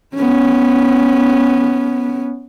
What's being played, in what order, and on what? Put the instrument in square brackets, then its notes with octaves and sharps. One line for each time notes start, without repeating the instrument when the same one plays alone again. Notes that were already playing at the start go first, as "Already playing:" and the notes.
[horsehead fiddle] B3 C#4